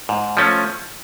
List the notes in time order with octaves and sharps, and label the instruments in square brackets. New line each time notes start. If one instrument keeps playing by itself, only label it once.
[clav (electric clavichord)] G#2
F3 A3 C#4